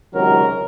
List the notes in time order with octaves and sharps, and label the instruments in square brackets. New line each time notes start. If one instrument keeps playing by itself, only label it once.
[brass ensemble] C#2 C3 D#3 F#3 A#4